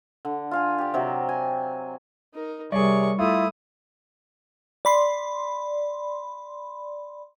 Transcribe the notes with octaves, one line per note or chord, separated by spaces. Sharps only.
D3
F4 F5 G#5
G4 D5
C3 F#3 G4
G#5
D#4 A#4
C3 G3 G#4 A#4 C#5 D5 C#6
A3 E4 F4 D#6
D5 B5 C6